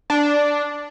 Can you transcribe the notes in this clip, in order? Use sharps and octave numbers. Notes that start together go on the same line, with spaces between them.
D4